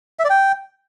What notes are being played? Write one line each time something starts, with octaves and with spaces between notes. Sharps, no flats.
E5
D5
G5